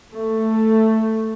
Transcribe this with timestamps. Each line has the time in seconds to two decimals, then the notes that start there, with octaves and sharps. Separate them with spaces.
0.12 A3